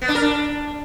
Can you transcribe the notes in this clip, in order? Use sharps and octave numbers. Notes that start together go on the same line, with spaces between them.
B3
D4
A#4
D4